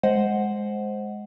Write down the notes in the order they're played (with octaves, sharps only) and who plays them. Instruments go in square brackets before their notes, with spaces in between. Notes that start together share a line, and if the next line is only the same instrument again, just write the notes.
[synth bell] G#3 C5 D#5 F#5